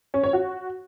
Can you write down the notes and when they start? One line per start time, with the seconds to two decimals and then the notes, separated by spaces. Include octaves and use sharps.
0.14 C#4
0.24 C#5
0.33 F#4